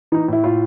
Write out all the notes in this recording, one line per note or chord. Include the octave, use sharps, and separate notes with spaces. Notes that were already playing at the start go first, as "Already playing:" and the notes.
E3 D#4
A2 E4
A2 F4